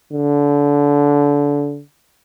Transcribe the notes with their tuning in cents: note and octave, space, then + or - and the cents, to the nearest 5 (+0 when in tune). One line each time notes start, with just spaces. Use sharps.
D3 -25